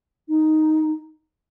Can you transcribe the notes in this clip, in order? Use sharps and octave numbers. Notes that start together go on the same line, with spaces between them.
D#4